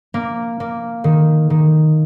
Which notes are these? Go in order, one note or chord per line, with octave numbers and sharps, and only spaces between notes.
A#3
A#3
D#3
D#3